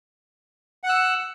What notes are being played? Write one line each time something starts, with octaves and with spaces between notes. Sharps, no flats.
F#5 E6 F#6